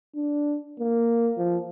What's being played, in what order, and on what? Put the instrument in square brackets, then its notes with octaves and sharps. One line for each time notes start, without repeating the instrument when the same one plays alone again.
[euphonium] D4
A#3
F3